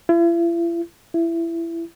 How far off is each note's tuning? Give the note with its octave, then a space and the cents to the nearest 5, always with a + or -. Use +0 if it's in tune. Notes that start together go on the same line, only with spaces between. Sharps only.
E4 +45
E4 +20